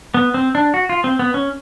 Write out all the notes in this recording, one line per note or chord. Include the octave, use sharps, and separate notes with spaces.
B3
C4
D4
F#4
F4
C4
B3
C#4